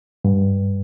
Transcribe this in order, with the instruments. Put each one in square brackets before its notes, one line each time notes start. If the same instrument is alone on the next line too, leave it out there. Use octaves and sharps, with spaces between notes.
[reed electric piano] G2